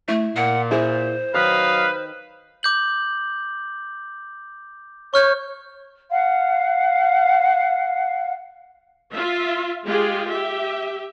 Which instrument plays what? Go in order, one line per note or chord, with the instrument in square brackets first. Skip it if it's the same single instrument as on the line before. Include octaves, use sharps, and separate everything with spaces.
[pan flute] A3 [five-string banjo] E4
[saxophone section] A#2 [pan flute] F#5
[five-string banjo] E4 G#4 [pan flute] C5
[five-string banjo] D#3 [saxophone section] F#3 D#5 F5 [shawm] B4
[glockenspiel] D6 G6 F#7
[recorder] C#5 [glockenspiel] C#6 F6 G6
[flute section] F5 F#5
[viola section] F4 E5
G#3 F4 G4 G#4
G4 E5